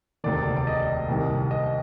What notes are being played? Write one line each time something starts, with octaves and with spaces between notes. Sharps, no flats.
E1 D2 C3 D#3 D5
D5
D#5
C2 C3 D#3
D#5